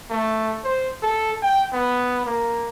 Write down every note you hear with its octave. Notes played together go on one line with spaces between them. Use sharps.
A3
C5
A4
G5
B3
A#3